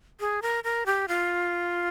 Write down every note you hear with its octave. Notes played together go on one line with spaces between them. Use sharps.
G#4
A#4
A#4
G4
F4